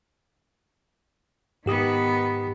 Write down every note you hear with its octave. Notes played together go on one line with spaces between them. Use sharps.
G#2 D#3 B3 G4 D#6